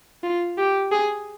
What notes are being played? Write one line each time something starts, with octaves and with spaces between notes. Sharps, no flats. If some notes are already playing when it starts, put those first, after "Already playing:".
F4
G4
G#4